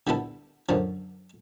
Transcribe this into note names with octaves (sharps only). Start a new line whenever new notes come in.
D3 G3 B3 E4 A4
F#2 D3 F3